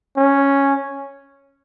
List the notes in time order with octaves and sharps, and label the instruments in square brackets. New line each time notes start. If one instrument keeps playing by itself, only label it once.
[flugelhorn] C#4